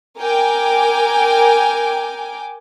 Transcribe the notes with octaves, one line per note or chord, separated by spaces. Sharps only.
A#4 G5 G#5 D6